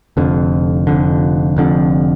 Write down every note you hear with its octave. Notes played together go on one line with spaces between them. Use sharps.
F1 F2 D3
F1 F2 D3
F1 F2 D3